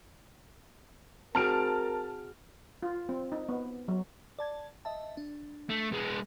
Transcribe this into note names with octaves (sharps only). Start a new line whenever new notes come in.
C4 F#4 G#4 A#4 A5 F6 D7
F4
C4
D#4
B3
F#3
D5 A5 G#6
D#5 E5 A5
D4
A3
G#3 B3